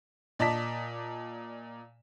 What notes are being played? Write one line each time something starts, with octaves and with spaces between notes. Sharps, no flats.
A#2 D5 D#5 A5 B6